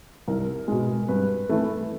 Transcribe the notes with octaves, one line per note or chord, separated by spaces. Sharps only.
C2 A#4
B2 G#3
G2 B4
E3 A3